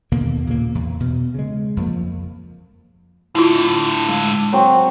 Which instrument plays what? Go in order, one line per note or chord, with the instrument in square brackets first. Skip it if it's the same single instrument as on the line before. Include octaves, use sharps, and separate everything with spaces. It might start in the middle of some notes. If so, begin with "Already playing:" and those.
[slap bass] D#2 B2 D3 A#3
A#2 C#3 A#3
E2
B2
C#3 G#3
F2 F3 A#3
[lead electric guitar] A2 D3 [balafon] E4 F4
[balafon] G#3
[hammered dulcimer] F#3 C4